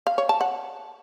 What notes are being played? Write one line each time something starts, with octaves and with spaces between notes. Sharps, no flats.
F5
C#5
A5
F#5